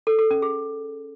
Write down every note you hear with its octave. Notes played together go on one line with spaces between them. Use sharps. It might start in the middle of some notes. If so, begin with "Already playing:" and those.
A4
A4
C#4
G#4